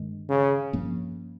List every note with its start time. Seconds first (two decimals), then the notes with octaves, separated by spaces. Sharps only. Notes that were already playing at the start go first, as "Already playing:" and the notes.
Already playing: G2 D#3 G#3
0.30 C#3
0.73 G2 F3 A#3 C#4